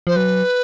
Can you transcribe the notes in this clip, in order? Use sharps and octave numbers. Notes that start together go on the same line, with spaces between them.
F3 C5
F#3 B4